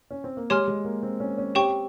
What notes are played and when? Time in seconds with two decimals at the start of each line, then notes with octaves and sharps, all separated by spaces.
0.11 C#4
0.24 C4
0.37 A#3
0.50 G#3 G4 C#5 G#5 C6 F6
0.68 G#3
0.85 A#3
1.03 C4
1.20 C#4
1.38 C#4
1.55 C4 G4 C#5 G5 C#6